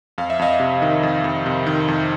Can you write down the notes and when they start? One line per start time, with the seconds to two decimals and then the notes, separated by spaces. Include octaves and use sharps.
0.18 F2 F5
0.30 E5
0.39 F2 D#5 F5
0.60 C3
0.82 D#3
1.03 F2
1.24 F2
1.46 C3
1.66 D#3
1.88 F2